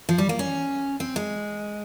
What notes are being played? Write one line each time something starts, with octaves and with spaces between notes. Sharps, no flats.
F3
G3
A#3
C#4
C4
G#3